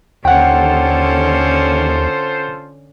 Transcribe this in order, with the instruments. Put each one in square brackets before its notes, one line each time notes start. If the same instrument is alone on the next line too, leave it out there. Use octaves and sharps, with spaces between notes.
[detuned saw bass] D#2 [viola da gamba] D3 C#4 [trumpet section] F4 A4 C5 [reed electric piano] F#5 G5